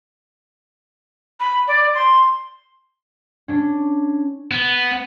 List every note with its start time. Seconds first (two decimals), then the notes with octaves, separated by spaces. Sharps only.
1.40 B5
1.68 D5
1.95 C6
3.48 C#4 D4
4.51 B3